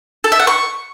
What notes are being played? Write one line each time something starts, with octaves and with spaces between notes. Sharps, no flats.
A4
E5
F#5
C#6